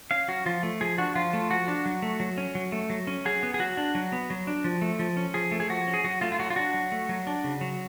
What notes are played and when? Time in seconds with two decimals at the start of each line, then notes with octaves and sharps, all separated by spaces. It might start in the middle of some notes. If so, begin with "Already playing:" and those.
0.11 C#4 F5
0.28 F#3 F#4
0.46 F3 F4
0.63 A3
0.81 F3 G#4
0.98 D4 F#4
1.15 F3 F4
1.33 A3
1.50 F3 F#4
1.68 D4
1.86 F#3
2.02 A3
2.20 F#3
2.38 C#4
2.55 F#3
2.72 A3
2.90 F#3
3.07 C#4
3.25 F#3 G#4
3.43 B3
3.54 G#4
3.59 F#3 F#4
3.77 D4
3.95 F#3
4.12 B3
4.30 F#3
4.47 D4
4.64 F3
4.82 A3
4.99 F3
5.17 C#4
5.34 F3 G#4
5.52 A3
5.60 G#4
5.69 F3 F#4
5.87 C#4
5.94 G#4
6.04 F#3 F#4
6.21 A3 F4
6.32 F4
6.39 F#3 F#4
6.50 F4
6.56 D4 F#4
6.74 F#3
6.92 A3
7.09 F#3
7.27 D4
7.44 C#3
7.61 F#3